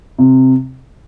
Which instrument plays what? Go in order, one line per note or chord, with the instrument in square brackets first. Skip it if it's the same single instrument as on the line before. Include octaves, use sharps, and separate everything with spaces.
[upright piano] C3